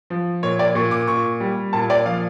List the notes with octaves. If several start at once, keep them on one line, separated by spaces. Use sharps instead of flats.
F3
A#2 C#5
D5
A#2 C#6
D6
A#2 C#6
G3
A#2 A5
D5
F3 F5